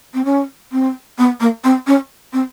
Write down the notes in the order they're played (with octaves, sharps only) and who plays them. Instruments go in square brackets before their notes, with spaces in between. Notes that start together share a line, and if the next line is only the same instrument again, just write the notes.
[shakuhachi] C4
C#4
C4
B3
A#3
C4
C#4
C4